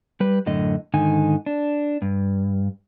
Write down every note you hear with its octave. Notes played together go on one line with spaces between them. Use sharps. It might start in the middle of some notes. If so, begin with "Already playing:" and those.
G3 B4
F#2 A2 D3 D#5
G#2 D3 D#3 D#4 G#5
D4
G2